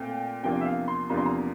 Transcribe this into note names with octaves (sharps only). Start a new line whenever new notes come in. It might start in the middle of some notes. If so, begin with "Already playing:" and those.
Already playing: A#2 A3 C4 G5
E2 C3 F3 A#3 D4 G5
E5
F5
C6
E2 C3 F3 A#3 D4 A#5
C6
A#5